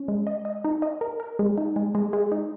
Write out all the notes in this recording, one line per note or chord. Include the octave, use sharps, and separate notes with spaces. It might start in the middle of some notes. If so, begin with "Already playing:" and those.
Already playing: C#4
G#3
D#5
D#5
D#4
D#5
A#4
A#4
G#3
D#4
G#3
G#3
G#3
D#4